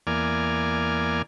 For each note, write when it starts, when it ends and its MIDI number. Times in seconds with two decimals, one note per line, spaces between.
0.07 1.22 40
0.07 1.22 58
0.07 1.22 74
0.07 1.22 80
0.07 1.22 89